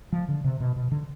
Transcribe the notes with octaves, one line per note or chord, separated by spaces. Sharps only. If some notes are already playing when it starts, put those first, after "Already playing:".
F3
D3
C3
B2
B2
D3